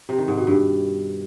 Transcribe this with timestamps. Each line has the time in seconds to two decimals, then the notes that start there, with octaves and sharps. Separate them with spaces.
0.09 C3
0.18 D#3
0.28 G#2
0.37 B2
0.47 G2